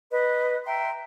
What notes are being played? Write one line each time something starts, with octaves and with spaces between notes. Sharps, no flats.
B4 D#5
E5 G5 A#5 C6